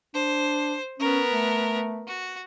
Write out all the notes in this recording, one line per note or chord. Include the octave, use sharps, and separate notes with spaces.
D4 C5
B3 C#4 A#4
A3
F#4